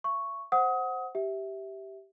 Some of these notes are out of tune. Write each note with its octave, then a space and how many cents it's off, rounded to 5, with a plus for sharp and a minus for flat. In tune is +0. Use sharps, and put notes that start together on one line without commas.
E5 +40 C#6 +0
C5 +0 F#5 +0 D#6 +30
G4 -10 E5 -10